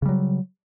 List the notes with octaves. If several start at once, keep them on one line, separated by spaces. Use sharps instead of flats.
C#3 F#3 G3